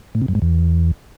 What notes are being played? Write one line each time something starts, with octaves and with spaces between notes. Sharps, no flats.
A2
C3
F#2
G#2
E2